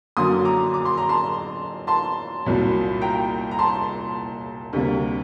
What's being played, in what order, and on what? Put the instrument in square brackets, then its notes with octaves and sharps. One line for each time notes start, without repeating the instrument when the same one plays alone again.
[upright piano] F#2 D3 F#3 A#3 C6 D#6
A#5 D6
D6
C6
A#5
A5 C6
A5 C6
C2 A#2 F#3
G5 A#5
A#5
A5 C6
D2 C3 G3 A#3